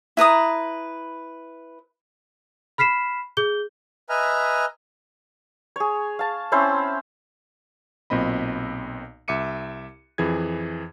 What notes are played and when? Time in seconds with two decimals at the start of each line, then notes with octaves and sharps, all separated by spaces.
0.17 E4 B4 A#5 D#6
2.78 B5 F6 B6 C7 E7
3.37 G#4 G6 G7
4.09 B4 D#5 E5 G#5 A#5 F6
5.76 G#4 C#5
6.19 F5 A5
6.52 C4 C#4 E4 C5
8.10 B1 A#2 C4 D#5 B5
9.28 C2 E5 D6 C#7 D#7
10.18 F2 E3 G#4 G#6